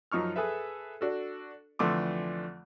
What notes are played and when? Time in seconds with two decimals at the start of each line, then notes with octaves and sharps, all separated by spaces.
0.12 F#2 F3 D#4 C#6 F6
0.36 G#4 A4 B4 E5
1.01 D4 F#4 A4
1.79 F2 D3 E3 A3 C6 D6